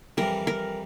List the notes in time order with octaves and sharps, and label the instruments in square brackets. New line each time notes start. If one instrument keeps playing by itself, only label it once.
[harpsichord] F2 E3 G3 [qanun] A#4
[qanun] A#4